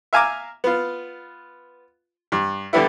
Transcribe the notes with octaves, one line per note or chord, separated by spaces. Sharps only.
E5 F5 G#5 A#5 D6
B3 F4
G2
D3 E3 G3 B3 E4